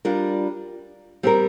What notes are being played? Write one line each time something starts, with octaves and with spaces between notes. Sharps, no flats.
G3 D4 F4 A#4
G3 C4 G4 A#4